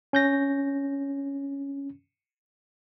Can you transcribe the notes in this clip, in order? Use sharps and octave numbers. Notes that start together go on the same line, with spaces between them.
C#4 G6 A#6